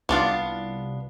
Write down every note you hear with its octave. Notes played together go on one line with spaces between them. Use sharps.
C2 B3 D4 F4